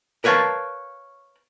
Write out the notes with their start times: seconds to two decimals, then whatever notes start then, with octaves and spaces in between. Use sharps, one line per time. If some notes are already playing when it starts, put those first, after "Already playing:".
0.24 A#4 B4 C#5 F5 A5